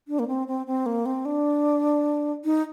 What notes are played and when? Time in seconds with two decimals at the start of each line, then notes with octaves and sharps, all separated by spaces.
0.08 D4
0.19 A#3
0.28 C4
0.48 C4
0.67 C4
0.86 A#3
1.06 C4
1.25 D4
2.45 D#4